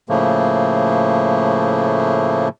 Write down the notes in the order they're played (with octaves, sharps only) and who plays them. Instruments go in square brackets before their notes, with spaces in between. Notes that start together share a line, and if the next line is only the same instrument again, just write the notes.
[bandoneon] A2 C#3 F3 A3 A#3